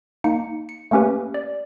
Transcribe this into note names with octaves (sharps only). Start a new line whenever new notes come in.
A#3 D#4 C#7
C#7
A3 A#3 C#4 G4 B4
D5